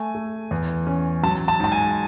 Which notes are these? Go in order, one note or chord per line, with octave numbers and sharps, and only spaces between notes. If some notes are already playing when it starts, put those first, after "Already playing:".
Already playing: A3 G#5
A3
E2
C#4
F#3 A5
A5
G#2 A5
G#5